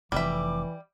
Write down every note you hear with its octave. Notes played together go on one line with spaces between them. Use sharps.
F1 F2 E3 G3 E5 D6